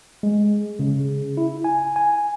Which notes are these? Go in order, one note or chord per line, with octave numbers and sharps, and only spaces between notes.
G#3
C#3
E4
G#5
G#5